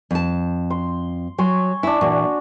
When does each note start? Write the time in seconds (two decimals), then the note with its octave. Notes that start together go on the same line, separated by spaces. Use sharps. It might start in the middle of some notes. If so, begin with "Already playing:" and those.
0.11 F2 A5
0.70 C6
1.38 F#3 C#5 G#5 C6
1.83 D4 E4 G#5
2.01 A#2 E3 F#4